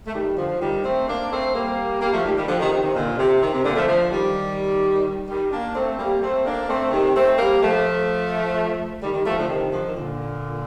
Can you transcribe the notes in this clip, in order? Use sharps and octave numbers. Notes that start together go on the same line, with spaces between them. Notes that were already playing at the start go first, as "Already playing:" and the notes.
A3
D#3 G3
D3 F3
D#3 G3
A3 C4
A#3 D4
A3 C4
G3 A#3
G3 A#3
F3 A3
D#3 G3
D#3 G3
D3 F3
C3 D#3
C3 D#3
C3 D#3
A#2 D3
C3
C3 D#3
C3
A#2 D3
F3 A3
D3 F3
D#3 G3
D#3 G3
A#3 D4
A3 C4
G3 A#3
A3 C4
A#3 D4
A3 C4
C3 D#3
A3 C4
G3 A#3
F3 A3
D#3 G3
D#3 G3
F3 A3
D3 F3
C3 D#3
D3 F3
D#3
A#2 D3